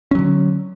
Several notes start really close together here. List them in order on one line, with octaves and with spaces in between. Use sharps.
C#4 F#3 D3